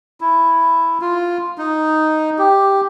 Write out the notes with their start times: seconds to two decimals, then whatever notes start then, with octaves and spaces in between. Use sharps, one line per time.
0.21 E4
1.01 F4
1.58 D#4
2.38 G4